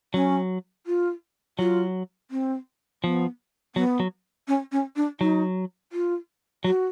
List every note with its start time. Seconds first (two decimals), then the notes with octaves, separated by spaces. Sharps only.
0.14 F#3 C#4
0.87 F4
1.59 F#3 F4
2.31 C4
3.03 F3 B3
3.76 F#3 B3
4.00 F#3
4.48 C#4
4.72 C#4
4.96 D4
5.20 F#3 D#4
5.92 F4
6.64 F#3 F#4